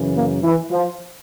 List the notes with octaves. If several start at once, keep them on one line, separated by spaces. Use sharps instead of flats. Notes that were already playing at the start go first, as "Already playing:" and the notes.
Already playing: F#2 C#3 E3
A#3
E3
F3